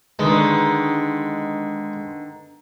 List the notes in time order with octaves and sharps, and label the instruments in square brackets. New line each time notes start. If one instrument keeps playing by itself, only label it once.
[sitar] D3 D#3 B3 [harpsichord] G#3